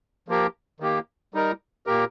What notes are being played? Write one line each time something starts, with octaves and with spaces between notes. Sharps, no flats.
F3 A#3 G4 A#4
D#3 A#3 G4
G3 D#4 A#4
A#2 A#3 G4 A#4